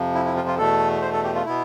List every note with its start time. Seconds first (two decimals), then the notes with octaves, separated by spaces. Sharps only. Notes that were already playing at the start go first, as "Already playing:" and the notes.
Already playing: F2 C3 F3
0.15 E4
0.26 E4
0.36 F4
0.47 F4
0.58 E2 B2 A3 A4
1.02 C5
1.13 A4
1.24 G4
1.35 F4
1.45 B2 B3 E4